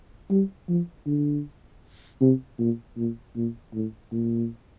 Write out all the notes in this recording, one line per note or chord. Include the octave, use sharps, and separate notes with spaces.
G3
F3
D3
C3
A#2
A#2
A#2
A2
A#2